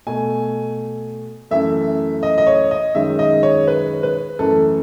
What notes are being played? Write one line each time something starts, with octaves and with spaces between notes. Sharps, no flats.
B2 A3 G#5
F#2 E3 A3 E5
D#5
D#5
C#5
D#5
F#2 D#3 G#3 E5
D#5
C#5
B4
B4
F#2 E3 A3 A4